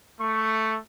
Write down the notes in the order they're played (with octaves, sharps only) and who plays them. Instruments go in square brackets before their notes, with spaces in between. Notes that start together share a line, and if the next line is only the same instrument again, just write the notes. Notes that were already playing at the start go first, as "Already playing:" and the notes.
[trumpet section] A3 [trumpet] C#6